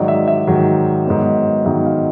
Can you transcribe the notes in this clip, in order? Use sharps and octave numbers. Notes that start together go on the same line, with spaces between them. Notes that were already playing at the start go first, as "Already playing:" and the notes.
Already playing: G#2 D#3 F#3 D5
E5
E5
G#2 D#3 F#3
G#2 D#3 F#3 B3
G#2 D#3 F#3 B3 E5
F5